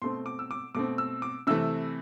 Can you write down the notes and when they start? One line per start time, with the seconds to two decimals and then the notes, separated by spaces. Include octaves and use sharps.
0.02 B2 A3 C4 C6
0.26 D6
0.39 E6
0.51 D6
0.75 B2 A3 C4 D6
0.98 E6
1.22 D6
1.47 C3 E3 A3 E6